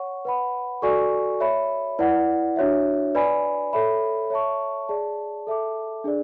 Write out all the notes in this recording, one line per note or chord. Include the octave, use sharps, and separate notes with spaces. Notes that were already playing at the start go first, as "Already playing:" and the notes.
Already playing: C#5 F#5 C#6
B4 F#5 B5
F#4 A4 D5 G#5 C#6
C#5 E5 B5
E4 B4 D5 F#5
D4 F#4 C#5 E5
B4 D5 G#5 B5
A4 C#5 E5 B5
C#5 E5 A5 C#6
G#4 D5 A5
A4 E5 A5 D6
D4 G#4 D5